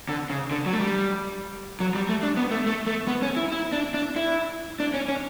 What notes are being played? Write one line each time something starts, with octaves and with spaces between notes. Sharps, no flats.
D3
C#3
D3
F#3
A3
G3
F#3
G3
A3
D4
B3
A3
A3
A3
B3
C#4
E4
E4
D4
D4
E4
D4
C#4
C#4